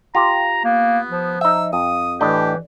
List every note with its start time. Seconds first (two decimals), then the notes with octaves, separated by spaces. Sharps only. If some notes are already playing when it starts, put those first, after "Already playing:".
0.15 F4 G4 A#5
0.65 A#3 B3
1.10 F3
1.41 D#4 E5 E6
1.73 F2 D#6
2.21 A2 E3 D4 G4 D#5